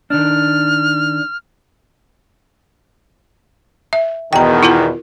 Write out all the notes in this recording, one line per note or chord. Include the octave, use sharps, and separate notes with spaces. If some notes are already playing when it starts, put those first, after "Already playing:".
D#3 D4 F6
E5
E2 B2 D#3 G5 A#5
E4 F4 A#4